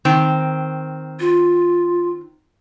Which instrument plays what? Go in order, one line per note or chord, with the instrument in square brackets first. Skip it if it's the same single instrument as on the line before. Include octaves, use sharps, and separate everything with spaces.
[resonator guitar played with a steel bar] D#3 C4
[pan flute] F4